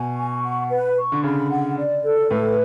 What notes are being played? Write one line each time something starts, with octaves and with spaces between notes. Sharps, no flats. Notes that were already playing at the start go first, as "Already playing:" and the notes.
Already playing: B2 G#5
C#6
F#5
B4
C#6
D3
C#3 B5
F#5
D5
A4
A2 B4